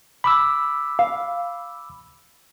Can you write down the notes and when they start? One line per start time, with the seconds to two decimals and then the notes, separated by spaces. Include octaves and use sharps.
0.24 B5 D6 E6
0.99 F5